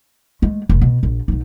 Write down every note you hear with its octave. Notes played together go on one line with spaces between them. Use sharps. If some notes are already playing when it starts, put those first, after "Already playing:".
G#3 A3
F1
B2
A#1
B1 D#4